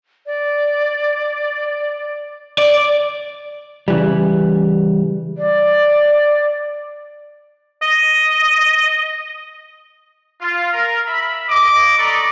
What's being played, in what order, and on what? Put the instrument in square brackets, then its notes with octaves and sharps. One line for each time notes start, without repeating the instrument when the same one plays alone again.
[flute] D5
[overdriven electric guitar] D5
[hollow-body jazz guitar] C#3 E3 G3
[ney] D5
[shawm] D#5
[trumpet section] F4
A#4
E5 B5
D#5 D6
A4 B4 D5 D#5 A#5 C#6